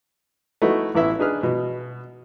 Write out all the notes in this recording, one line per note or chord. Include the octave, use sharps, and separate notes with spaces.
A3 B3 D#4 E4 F#4
A1 B3 E4 E5
D4 D#4 G#4 B4 F6
B2